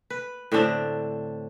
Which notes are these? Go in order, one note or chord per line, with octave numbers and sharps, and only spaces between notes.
B4
A2 D3 C4 D4